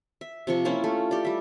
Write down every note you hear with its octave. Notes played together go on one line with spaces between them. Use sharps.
E5
C3 F3 C#6
A#3 C#4 E4 F4
A3
G4 D5
G3 E5